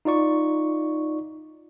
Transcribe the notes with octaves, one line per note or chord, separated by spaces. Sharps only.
D#4 F4 D5 C#6